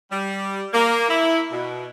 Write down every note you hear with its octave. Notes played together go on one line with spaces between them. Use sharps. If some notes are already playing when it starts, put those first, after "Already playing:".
G3
A#3
E4
B2